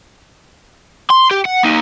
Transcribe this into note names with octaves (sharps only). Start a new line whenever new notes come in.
C6
G4
F#5
A#3 D#4